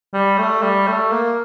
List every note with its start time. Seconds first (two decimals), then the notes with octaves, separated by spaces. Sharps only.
0.14 G3
0.38 A3
0.62 G3
0.87 A3
1.11 A#3